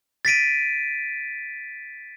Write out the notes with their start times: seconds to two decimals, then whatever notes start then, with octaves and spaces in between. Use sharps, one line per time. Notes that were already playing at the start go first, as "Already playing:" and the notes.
0.25 A6 B6 D7 D#7